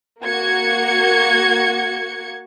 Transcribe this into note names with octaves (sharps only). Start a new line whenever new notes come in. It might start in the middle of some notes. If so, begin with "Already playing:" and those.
A#3 F#4 G#6 C#7